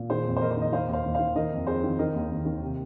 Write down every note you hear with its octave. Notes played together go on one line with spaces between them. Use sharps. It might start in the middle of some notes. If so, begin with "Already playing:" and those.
Already playing: A#2
D#3 G#4 C5
F2
C5
F2 A#4 D#5
C5
D#3
D#5
D#3 C5 F5
D#2
C5 F5
D#2
C5 F5
D#3
D#3 A#4 D#5
F2
F2 G#4 C5
D#3
D#3 A#4 D#5
D#2
D#2
D#3
C3